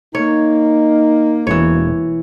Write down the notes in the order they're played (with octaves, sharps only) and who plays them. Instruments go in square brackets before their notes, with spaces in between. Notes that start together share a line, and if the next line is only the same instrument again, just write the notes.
[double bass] A#3 [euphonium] D#4 [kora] C#5
[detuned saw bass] E1 [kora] E3 C#5